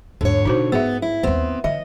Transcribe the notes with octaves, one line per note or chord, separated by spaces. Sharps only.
E2 G#2 D3 C#5
B2 D4 D#4 F#4 C5
G#2 B3 G#4 E5
E4
D#1 D#2 B3 C4
D3 F3 D#5 E5